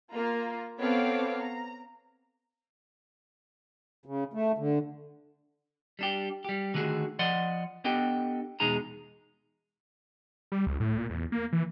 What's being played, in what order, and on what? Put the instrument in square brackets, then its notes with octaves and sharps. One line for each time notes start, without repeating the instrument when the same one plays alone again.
[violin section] A#3 F4 A#5
B3 C4 A4 C#5 F5 D6
A#5
[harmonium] C#3
A3
D3
[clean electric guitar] G3 D4 G4
G3 G4
D3 D#3 A3 F#4 G#4
F3 D5 D#5 F#5 C6
B3 D4 G4 A4 D#5 G5
E2 B2 G#3 D#4 G#4 A#5
[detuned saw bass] G3
C#2
A2
A#2
E2
A#3
E3